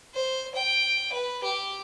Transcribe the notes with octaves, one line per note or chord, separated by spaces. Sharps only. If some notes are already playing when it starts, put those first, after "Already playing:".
C5
G5
B4
G4